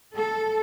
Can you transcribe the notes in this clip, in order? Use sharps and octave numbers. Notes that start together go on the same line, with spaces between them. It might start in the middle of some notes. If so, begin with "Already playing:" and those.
A4